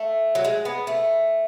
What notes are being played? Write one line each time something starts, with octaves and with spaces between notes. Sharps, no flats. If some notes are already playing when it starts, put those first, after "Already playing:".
Already playing: A3
F#3
G#3
B3
A3